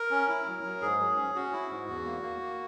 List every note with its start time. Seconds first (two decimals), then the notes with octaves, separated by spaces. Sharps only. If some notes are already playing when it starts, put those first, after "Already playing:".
Already playing: A#4
0.11 C#4
0.28 E4
0.46 F#3
0.64 F#3
0.81 G#2 G#4
1.00 F#3
1.17 C#4
1.35 C#4 F#4
1.53 E4
1.70 G#2
1.88 E2
2.05 A#3
2.23 A#3
2.41 A#3